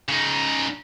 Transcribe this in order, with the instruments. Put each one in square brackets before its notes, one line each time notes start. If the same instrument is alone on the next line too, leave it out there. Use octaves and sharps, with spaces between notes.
[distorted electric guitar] C#3 D#4